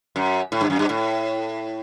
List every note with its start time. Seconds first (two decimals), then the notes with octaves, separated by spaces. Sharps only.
0.16 F#2
0.52 A2
0.61 G2
0.70 F#2
0.79 G2
0.89 A2